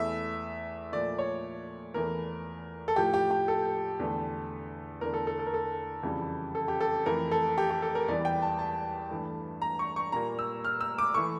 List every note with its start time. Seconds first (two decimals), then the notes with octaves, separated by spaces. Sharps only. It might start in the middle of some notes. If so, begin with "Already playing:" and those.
Already playing: E2 E3 A3 E5
0.92 A#2 F3 A3 D5
1.18 C#5
1.94 E2 E3 A3 A#4
2.88 A4
2.96 A2 F3 A3 G4
3.14 G4
3.31 G4
3.48 A4
4.00 E2 D3 A3
5.01 E2 D3 A3 A#4
5.14 A4
5.27 A4
5.39 A4
5.46 A#4
5.54 A4
6.03 F2 C#3 E3 G3
6.55 A4
6.68 G4
6.80 A4
7.06 F2 E3 A3 A#4
7.31 A4
7.58 G4
7.70 G4
7.82 A4
7.95 A#4
8.08 E2 E3 G3 D5
8.25 G5
8.42 A5
8.59 A5
9.11 G2 E3 A3
9.62 A#5
9.79 C#6
9.96 C#6
10.12 A#2 G3 A#3 A#5
10.39 E6
10.64 F6
10.81 E6
10.98 D6
11.14 E3 A3 C#6